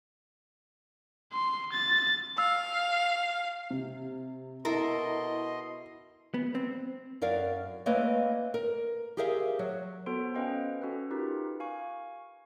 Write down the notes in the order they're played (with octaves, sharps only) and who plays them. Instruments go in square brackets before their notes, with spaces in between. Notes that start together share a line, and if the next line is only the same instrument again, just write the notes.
[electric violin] C6
A6
[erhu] F5 [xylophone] E6
[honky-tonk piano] C3
[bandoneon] B2 D#5 C6 [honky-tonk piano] E4 [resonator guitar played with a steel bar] A4 A#4
[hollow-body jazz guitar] B3
C4
[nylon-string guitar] F#2 A#4 D5 F5
A3 A#3 C4 B4 C#5 D#5
A#4
G4 G#4 A#4 C5 E5 F5
F#3
[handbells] B3 F#4 A4 C5 C6 D7
C#4 B4 C5 D#5 F5 G5
C#4 F#4 A4 B4
D#4 F4 G4 A#4 B4
F5 G#5 C#6